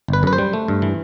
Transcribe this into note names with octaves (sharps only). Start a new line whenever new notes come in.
G1 B4
F#2 B4
C5
G3
A3
G2
E3